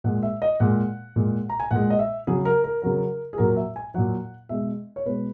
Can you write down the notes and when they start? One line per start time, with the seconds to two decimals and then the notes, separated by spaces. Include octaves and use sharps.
0.04 A#2 G#3 F#5
0.23 E5
0.42 D#5
0.60 A#2 G#3 F#5
1.16 A#2 G#3
1.49 A#5
1.60 G#5
1.71 A#2 G#3 F#5
1.90 D#5
1.99 E5
2.27 C#3 F#3 G#4
2.45 A#4
2.64 A#4
2.82 C#3 F#3 A#4
3.33 G#4
3.38 A#2 F#3 A#4
3.56 E5
3.76 G#5
3.94 A#2 F#3 F#5
4.49 B2 G#3 E5
4.96 C#5
5.05 B2 G#3 B4